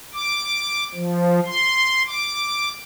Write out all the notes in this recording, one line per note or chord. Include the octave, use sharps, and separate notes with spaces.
D6
F3
C6
D6